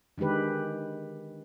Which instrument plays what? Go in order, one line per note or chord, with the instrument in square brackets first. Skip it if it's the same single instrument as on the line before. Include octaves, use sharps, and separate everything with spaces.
[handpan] D3 D#3 G#3 G4 B4